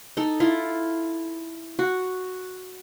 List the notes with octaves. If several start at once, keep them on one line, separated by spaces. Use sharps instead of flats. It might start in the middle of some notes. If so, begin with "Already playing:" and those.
D#4 A4
E4 F4
F#4